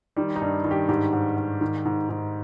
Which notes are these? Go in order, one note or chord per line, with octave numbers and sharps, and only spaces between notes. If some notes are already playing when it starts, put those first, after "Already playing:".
D#3 G3
D#4
G2
D#3
G4
G#2 G4
G#2
G#2
D#3
G#2
G#2